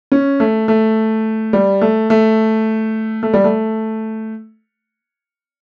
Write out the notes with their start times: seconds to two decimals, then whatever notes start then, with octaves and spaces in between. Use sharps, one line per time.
0.12 C#4
0.40 A3
0.68 A3
1.53 G3
1.81 A3
2.10 A3
3.23 A3
3.33 G3
3.44 A3